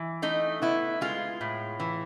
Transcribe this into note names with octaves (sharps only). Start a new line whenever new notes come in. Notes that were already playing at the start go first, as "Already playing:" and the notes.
Already playing: E3
A3 D#4
B3 E4
G#3 F4
A2
E3